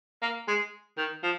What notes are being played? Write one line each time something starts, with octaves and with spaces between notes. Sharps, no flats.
A#3
G#3
D#3
F3